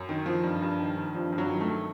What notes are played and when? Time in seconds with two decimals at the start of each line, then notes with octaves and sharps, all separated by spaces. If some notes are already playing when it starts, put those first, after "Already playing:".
Already playing: F#2
0.09 D#3
0.26 D#3 F3
0.43 G2
0.62 G2
0.80 D#3
0.97 D#3
1.14 G2 F3
1.32 G2
1.38 F#3
1.49 D#3
1.61 A3
1.67 D#3